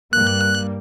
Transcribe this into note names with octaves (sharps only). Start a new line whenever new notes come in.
G2 G3 A#3 F#6